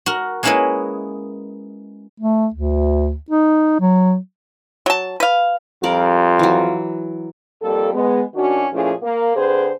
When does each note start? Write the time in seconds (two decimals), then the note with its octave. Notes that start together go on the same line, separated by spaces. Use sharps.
0.06 F#4 A#4
0.43 G#3 A#3 C#4 E4 B4 D#5
2.20 A3
2.54 D2
3.30 D#4
3.80 F#3
4.86 F#3 A5
5.20 B4 F5
5.83 F2 G3 F4 A#4 D5
6.39 E3 F#3
7.62 F2 G3 A#3 A4
7.94 G#3 B3
8.34 D#3 C#4 D4 F#4
8.73 A#2 F3 A3 C#4 E4 G#4
9.02 A#3
9.36 D3 C4 G#4 B4 C5